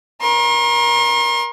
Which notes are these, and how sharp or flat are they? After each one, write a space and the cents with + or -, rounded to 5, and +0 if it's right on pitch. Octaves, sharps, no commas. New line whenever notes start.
A#4 +30 C6 +45